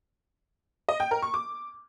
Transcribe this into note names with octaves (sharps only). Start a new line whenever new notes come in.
D#5
G5
A#4
C#6
D6